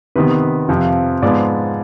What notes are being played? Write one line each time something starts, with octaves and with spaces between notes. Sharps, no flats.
C3 D#3 B3 B4
F2 C3 F3
G#2 F3 B3 D5